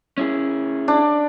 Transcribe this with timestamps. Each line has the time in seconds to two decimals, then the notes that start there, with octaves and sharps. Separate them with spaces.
0.18 C#4 E4 G#4
0.88 D4